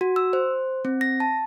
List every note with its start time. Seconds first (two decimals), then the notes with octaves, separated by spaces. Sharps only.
0.01 F#4
0.16 E6
0.33 C5
0.85 C4
1.01 A#6
1.20 A5